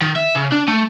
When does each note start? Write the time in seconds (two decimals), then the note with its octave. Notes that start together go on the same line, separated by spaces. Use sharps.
0.02 D#3
0.16 E5
0.35 C#3
0.52 D4
0.68 A3